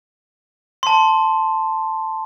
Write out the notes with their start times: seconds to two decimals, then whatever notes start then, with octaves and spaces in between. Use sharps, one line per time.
0.83 A5 C6